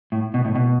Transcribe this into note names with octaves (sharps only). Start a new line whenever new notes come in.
A2
B2
A2
B2